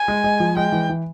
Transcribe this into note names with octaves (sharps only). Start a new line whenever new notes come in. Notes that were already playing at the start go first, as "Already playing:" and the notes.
Already playing: G#5
G#3
G#3
F3
G#3 G5
E3
E3